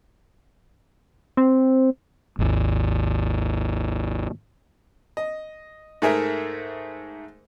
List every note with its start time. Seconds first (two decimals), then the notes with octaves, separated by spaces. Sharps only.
1.37 C4
2.39 G#1 D#2
5.17 D#5
6.02 G#2 A3 G#4 A#4 E5